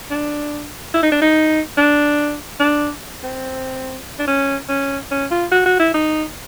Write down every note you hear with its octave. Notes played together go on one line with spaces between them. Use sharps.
D4
E4
D#4
D4
D#4
D4
D4
C4
D4
C#4
C#4
C#4
F4
F#4
F#4
E4
D#4